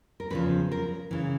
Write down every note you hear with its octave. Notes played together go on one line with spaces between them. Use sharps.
A#4
E2 C#3 F3 B4
A#4
C#3 E3